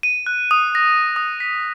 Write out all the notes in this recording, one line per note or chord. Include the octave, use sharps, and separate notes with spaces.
D#7
F#6
D#6
A#6
D#6
B6